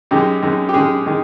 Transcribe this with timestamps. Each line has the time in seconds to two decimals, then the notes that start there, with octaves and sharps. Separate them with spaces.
0.11 F#2 D#3 G#3 G4
0.42 F#2 D#3 G#3
0.69 G4
0.74 F#2 D#3 G#3 G#4
1.06 D#3 G#3